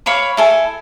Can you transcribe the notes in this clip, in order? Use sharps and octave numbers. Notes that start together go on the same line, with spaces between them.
C#5 F5 B5 D6
E4 A4 G#5